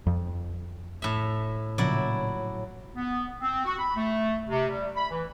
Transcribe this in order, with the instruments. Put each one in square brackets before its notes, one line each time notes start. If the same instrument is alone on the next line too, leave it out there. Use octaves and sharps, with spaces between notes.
[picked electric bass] F2
[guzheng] A2 E5
[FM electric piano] A#2 C#3 F3 [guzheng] F#3 E4 D5
[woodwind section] B3
C4
F#4
B5
A3
C3
G3
B5
E3